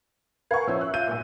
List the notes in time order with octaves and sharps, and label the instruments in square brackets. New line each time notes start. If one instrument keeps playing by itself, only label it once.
[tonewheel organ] A#4 B4 G#5 [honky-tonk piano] F5 F#5 C#6
[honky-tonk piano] F3 C#4 C5 [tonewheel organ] E5
[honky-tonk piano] F#6
F4 G6 D#7
B1 A#2